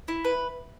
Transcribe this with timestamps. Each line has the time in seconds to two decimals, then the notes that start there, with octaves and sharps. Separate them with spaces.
0.08 E4
0.25 B4